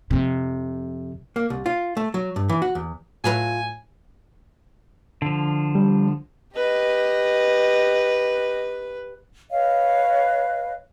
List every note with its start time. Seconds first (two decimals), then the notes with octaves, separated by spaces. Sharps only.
0.11 F2 C3
1.36 A#3
1.50 C2
1.66 F4
1.97 A3
2.14 F#3
2.36 G2
2.49 E3
2.62 F#4
2.75 E2
3.24 A2 F#3 F4 B4 G#5
5.22 D3 F3
5.75 G3
6.56 G4 B4 D#5
9.50 B4 C#5 D#5 F5